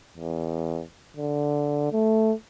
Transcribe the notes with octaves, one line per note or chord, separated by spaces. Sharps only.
E2
D3
A3